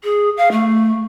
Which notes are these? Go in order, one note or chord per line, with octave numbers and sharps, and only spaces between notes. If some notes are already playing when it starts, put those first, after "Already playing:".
G#4
F5
A3